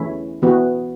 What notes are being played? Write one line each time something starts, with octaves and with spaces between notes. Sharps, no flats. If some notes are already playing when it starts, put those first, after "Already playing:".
Already playing: E3 A3 C#4 E4
E3 B3 F#4